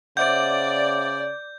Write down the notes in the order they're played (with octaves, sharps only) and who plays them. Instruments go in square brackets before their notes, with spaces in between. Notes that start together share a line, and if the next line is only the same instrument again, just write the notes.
[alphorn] C#3 [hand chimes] C5 E5 F#5 [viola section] D5 [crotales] G6